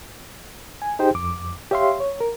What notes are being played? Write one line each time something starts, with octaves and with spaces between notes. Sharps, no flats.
G#5
D#4 G4 G#4 C5 G5
F2 D6
G4 C#5 E5 F5 C6
C#5
A#4